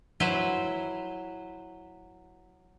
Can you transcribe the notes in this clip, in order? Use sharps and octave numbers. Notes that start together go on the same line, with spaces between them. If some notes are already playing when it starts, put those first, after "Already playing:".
F#3 E4 B4 C5